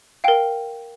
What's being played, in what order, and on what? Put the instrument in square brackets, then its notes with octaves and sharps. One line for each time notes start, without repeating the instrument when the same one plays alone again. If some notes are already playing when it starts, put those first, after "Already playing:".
[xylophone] A#4 F5 G5